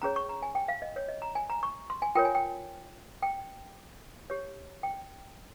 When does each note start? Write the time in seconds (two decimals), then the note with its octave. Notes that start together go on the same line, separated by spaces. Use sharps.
0.02 C#4 G#4 C#5 A#5
0.16 C#6
0.29 A#5
0.42 G#5
0.55 G5
0.68 F5
0.82 D#5
0.96 C#5
1.08 D#5
1.22 A#5
1.35 G#5
1.50 A#5
1.63 C#6
1.90 C6
2.02 G#5
2.15 F4 A#4 C#5 G5
2.25 G#5
2.35 G5
3.22 G5
4.30 G4 C#5
4.83 G5